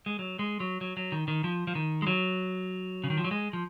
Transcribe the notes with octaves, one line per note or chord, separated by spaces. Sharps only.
G#3
F#3
G#3
F#3
F#3
F#3
D#3
D#3
F3
F3
D#3
G#3
F#3
C#3
D#3
F3
F#3
G#3
F3